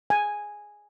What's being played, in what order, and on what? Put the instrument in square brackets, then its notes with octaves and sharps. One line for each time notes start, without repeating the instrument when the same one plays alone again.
[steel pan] G#5